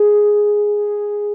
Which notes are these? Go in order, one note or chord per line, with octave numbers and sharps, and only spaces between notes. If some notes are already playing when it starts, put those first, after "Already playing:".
Already playing: G#4